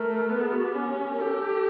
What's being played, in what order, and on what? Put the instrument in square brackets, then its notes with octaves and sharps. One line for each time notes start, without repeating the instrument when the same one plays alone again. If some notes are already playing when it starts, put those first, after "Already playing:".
Already playing: [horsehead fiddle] A3 [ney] A#4
[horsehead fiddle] B3 [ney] B4
[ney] G#4
F#4
G4
[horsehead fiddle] C#4
[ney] A#4
[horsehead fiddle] G4 [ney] A4